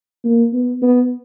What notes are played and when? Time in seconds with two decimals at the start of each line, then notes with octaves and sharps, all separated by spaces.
0.24 A#3
0.53 B3
0.82 B3